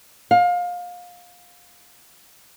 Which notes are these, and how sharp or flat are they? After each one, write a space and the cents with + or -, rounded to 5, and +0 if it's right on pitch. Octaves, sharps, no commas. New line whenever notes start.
F5 +25